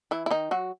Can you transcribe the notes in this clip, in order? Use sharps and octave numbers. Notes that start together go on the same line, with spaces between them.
E3 E4
E4
D#3 D#4
F#3 F#4